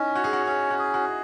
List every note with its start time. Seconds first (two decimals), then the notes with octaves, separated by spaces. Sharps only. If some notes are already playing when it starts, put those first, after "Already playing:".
Already playing: C#4 D#4 E4
0.15 F#4 C#5
0.24 G#4
0.33 F#4
0.46 C#4 G#4
0.70 F#4
0.79 G#4
0.94 F#4